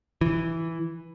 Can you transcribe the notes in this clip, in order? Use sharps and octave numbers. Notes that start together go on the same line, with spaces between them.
E3